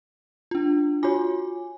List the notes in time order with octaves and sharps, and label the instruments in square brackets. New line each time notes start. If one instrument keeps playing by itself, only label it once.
[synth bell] D4 F4
[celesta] F4 F#4 C#5 [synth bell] G#5 D6